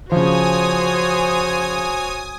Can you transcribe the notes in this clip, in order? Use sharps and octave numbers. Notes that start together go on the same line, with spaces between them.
C#3 F3 F#4 C5 C#5 G#5 D#6